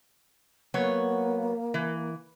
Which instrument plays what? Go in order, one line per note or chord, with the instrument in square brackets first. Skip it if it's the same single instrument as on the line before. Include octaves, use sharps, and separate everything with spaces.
[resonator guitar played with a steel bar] F#3 B3 C#5 [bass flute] A#3
[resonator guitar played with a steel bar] E3